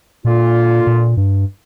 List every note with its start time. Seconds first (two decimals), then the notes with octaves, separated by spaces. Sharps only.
0.25 A#2 D3 A#3 F4
0.87 A#2
1.17 G2